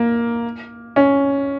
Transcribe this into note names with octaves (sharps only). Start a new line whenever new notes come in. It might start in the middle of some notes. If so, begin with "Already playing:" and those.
Already playing: A#3
C#4